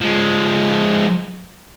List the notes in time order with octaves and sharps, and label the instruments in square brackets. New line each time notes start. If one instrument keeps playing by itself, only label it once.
[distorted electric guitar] F3 G#3